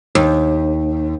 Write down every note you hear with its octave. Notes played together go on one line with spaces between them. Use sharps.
D#2